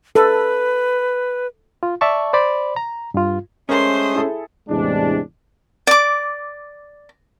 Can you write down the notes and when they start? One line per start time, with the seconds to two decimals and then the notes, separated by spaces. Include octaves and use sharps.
0.15 A4 B4
1.83 F4
2.01 D5 E5 A5 C#6
2.33 C5 D5 B5
2.76 A#5
3.14 G2 F4
3.69 G#3 A3 C#4 A#4 C5 C6 D#6
4.15 E4 G#4 A4
4.69 E2 A2 C3 G#3 D4
5.87 D5 D6